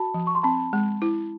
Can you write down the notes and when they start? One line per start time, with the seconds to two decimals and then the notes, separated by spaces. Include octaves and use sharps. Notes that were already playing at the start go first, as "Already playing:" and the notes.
Already playing: F#4 A5 B5
0.14 F3
0.27 C#6
0.35 C6
0.43 C4 A5 B5
0.73 G#3
1.02 E4